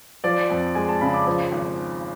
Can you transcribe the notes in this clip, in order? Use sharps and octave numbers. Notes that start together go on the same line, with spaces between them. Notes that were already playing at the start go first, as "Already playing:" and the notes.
F3 D5
F2
G#3 G#5
A5
C#3 B5
D6
F3
G#1